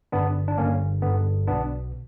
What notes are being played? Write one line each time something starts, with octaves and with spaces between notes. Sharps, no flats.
G1 G2 D3 B3 D4
D4
G1 G2 D3 A#3 C#4
G1 G2 D3 B3
B1 B2 B3 D4